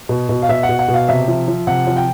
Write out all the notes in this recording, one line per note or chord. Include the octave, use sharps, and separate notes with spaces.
B2
B2
F5
B2 E5
F#5
B2
F#5
B2
F5
C3 E5
F3
F3
C3 F#5
F3
G5